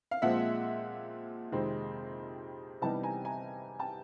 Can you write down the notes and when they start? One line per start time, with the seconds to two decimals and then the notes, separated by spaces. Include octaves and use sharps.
0.11 F5
0.22 A#2 F3 G#3 C4 E5 F#5
1.52 F2 C3 D#3 G#3 C4
2.82 C3 E3 G3 B3 D#4 G5 A5
3.03 G#5 A#5
3.25 G#5 A#5
3.79 G5 A5